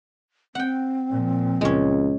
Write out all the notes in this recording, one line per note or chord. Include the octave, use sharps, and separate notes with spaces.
C4 F#5 G5
A#2 F3
C#2 G#3 C#4